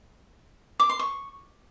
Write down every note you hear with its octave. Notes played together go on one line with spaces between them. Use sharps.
D6
C6
C#6